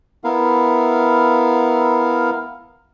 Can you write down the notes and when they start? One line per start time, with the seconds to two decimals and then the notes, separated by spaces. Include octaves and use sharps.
0.24 B3 E4 A#4 F5